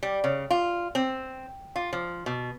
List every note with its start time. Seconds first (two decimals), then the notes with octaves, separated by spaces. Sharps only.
0.03 G3
0.24 C#3
0.51 F4
0.95 C4
1.76 F4
1.93 F3
2.26 B2